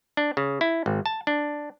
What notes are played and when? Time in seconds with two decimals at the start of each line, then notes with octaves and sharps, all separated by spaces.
0.17 D4
0.37 C#3
0.61 E4
0.86 G#1
1.06 A5
1.27 D4